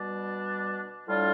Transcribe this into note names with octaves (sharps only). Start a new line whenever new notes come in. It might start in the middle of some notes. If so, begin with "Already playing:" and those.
Already playing: B2 G3 D4
A2 G3 D4 F4